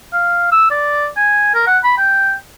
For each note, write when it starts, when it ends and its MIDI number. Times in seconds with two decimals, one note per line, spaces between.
0.13 0.51 77
0.52 0.68 88
0.71 1.07 74
1.17 1.50 80
1.54 1.62 70
1.67 1.78 78
1.84 1.94 83
1.98 2.33 79